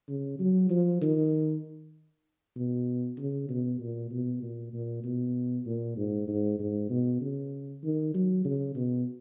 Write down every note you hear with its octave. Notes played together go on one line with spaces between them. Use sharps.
C#3
F#3
F3
D#3
B2
C#3
B2
A#2
B2
A#2
A#2
B2
A#2
G#2
G#2
G#2
B2
C#3
D#3
F#3
C#3
B2